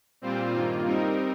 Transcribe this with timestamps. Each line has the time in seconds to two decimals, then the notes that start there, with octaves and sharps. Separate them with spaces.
0.21 A#2 G3 C4 F4 C5
0.52 G2 D#3 A#3 F4
0.85 G3 C4 D#4 A#4